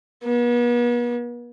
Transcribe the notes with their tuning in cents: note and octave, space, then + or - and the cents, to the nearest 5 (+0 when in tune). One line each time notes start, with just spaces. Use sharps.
B3 -40